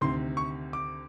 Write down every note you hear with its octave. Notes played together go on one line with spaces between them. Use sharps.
D2 C3 D#3 C6
C#6
D6